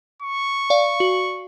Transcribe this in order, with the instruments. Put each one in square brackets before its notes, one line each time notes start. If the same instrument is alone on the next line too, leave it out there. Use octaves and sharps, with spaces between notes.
[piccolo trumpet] C#6
[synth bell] D5 F5
F#4